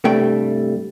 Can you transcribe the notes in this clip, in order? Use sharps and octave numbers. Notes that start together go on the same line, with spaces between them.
C2 G2 G3 A3 G5